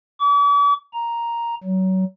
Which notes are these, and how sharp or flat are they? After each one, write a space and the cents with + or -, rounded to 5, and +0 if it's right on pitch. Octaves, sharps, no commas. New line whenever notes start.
D6 -45
A#5 +5
F#3 +25